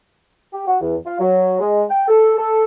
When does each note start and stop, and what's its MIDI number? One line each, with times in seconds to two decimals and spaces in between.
0.53 0.67 67
0.67 0.77 66
0.80 0.95 40
1.05 1.17 65
1.18 1.57 54
1.60 1.83 56
1.89 2.08 79
2.08 2.37 69
2.37 2.64 69